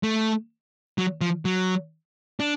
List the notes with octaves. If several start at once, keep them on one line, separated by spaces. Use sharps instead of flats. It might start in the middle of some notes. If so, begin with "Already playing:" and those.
A3
F#3
F3
F#3
D4